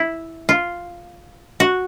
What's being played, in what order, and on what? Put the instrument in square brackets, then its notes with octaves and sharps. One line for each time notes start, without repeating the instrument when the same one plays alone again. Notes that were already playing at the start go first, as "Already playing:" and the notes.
Already playing: [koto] E4
F4
F#4